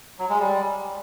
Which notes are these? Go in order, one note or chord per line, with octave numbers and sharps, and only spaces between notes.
F#3
G#3
G3